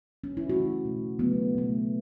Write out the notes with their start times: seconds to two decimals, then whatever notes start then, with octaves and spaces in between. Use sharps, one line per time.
0.24 C#4
0.37 E4
0.49 C#3 E3 A3 F#4
0.85 B2 A3
1.19 C#3 F#3 A3 B3
1.55 B2 A3